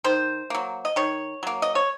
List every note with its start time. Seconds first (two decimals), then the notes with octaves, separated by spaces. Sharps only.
0.04 D#3 C5
0.50 F#3 A#3
0.85 D#5
0.96 D#3 C#5
1.43 F#3 A#3
1.62 D#5
1.75 C#5